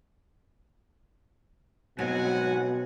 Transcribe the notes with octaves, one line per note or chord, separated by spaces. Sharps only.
G#2 B2 F#3 B3 C4 F#5 G#5